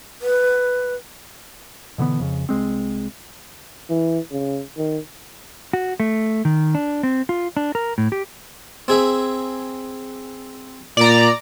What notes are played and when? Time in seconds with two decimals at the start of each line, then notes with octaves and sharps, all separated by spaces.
0.22 B4
1.98 B2 D3 E3 B3
2.19 F2 C#3
2.49 C2 G#3 C4
3.90 E3
4.32 C#3
4.77 D#3
5.73 F#4
6.00 A3
6.45 D#3
6.75 D4
7.03 C4
7.29 F4
7.57 D4
7.75 A#4
7.98 A2
8.12 G4
8.88 C4 G#4 E5
10.97 A#2 D5 A#5